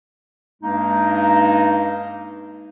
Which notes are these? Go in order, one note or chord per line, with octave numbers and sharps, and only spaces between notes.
G2 G#3 A#3 D#4